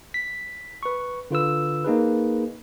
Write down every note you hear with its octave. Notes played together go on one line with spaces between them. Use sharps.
B6
B4 C#6
D3 F4 B4 E6
A#3 D#4 G#4 B4